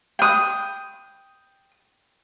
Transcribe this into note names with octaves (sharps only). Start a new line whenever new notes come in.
G5 D#6